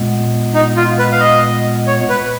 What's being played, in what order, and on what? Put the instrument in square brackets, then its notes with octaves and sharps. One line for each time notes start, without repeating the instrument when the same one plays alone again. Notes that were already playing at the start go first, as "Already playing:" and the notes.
Already playing: [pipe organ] A#2 G#3 B3
[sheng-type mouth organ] D#4
F4
B4
F5
D#5
C#5
B4